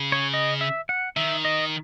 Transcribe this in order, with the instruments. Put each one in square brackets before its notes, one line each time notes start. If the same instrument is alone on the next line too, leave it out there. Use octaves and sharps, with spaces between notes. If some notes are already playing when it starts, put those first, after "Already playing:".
Already playing: [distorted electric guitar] C#3
[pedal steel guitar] C#5
D#5
E5
F#5
[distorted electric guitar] D#3 [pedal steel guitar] E5
[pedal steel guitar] D#5